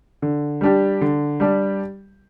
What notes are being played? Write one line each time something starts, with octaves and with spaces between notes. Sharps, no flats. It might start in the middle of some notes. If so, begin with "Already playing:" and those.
D3
G3 D4 G4
D3
G3 D4 G4